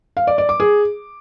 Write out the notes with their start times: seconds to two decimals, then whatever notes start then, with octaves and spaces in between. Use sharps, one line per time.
0.17 F5
0.27 D5
0.38 D5
0.49 D6
0.60 G#4